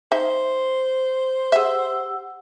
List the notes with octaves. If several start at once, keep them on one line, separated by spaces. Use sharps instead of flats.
D#4 C5 E5
G4 G#4 E5 F#5 E6